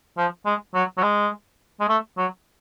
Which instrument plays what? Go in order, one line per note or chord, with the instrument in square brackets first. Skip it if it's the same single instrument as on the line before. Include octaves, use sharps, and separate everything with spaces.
[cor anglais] F3
G#3
F#3
F#3
G#3
G#3
A3
F#3